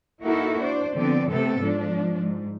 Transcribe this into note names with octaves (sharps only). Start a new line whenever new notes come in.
A#3 D#4 E4 F#4 A4 A#4
D4 C5 D5
D3 F3 B3 C4 D5
C3 A3 B3 C4 A4
G#2 F3 D4
G#2